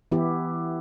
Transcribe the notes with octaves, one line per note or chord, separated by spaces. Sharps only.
E3 B3 E4 G4